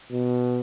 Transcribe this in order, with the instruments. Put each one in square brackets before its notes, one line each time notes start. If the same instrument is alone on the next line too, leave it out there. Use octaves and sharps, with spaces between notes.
[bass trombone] B2